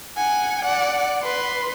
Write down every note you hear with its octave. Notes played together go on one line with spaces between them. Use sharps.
F#5 G#5
D5 F#5
B4 C6